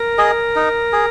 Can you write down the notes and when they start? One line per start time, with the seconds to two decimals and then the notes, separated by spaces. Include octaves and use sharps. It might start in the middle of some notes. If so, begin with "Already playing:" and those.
Already playing: A#4
0.18 G#4 D#5
0.56 D#4
0.93 G#4